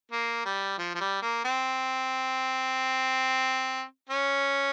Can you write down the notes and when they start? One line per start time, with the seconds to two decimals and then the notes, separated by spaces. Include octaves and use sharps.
0.12 A#3
0.45 G3
0.78 F3
0.95 F3
1.00 G3
1.22 A#3
1.45 C4
4.09 C#4